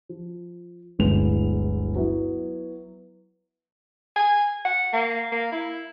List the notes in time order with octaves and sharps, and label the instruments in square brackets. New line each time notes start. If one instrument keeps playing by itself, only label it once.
[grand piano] F3
D1 G1 A2 G#3 B3 F7
F#3 B3 E4
[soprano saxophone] G#5
F#5
A#3
A#3
E4